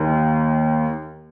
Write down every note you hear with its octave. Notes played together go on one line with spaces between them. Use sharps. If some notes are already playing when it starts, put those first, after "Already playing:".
Already playing: D#2 D#3